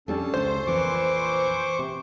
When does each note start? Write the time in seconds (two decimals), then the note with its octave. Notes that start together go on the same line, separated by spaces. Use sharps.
0.08 F2 G3 C#4 D4 A4 A5
0.34 C#2 C5
0.67 A#1 F2 A#2 E3 C#6 D6
1.79 C3